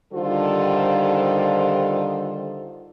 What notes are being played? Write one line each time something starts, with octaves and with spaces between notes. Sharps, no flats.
D3 D#3 G3 F4 A4 C5